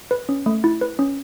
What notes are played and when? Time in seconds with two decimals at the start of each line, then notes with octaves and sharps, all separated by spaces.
0.11 B4
0.29 C#4
0.46 A3
0.64 E4
0.81 B4
0.99 C#4